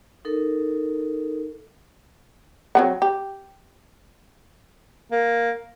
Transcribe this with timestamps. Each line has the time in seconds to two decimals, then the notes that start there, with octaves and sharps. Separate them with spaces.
0.25 D#4 A4 A#4
2.75 F#3 C4 F#5
3.02 G4
5.12 A#3